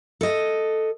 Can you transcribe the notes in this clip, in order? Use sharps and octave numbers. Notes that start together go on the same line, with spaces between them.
A4 D#5